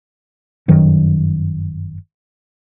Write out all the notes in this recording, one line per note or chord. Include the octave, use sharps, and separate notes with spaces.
G1 F#2 D#3 F#3